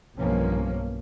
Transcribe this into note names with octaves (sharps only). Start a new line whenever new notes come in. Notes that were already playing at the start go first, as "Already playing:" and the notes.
B1 G2 B2 F3 A#3 C#4